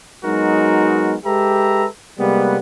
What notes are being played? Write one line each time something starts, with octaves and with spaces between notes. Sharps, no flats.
F#3 G#3 B3 D#4 F#4 A#4
G#3 G4 A4 B4 E5 A#5
C3 G3 G#3 A#3 B3